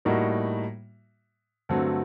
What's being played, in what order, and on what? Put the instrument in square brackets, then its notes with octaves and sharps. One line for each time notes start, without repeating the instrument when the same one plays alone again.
[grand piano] A2 G3 A#3 D#4 F#4
G2 D3 F#3 A3 C4